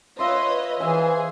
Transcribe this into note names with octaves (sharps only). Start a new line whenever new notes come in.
F4 B4 C#5 D#5 E5 C6
E3 G#4 C5 E5 G#5